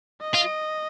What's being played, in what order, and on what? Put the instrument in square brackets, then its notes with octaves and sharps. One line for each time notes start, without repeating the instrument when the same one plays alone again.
[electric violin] D#5
[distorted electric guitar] F4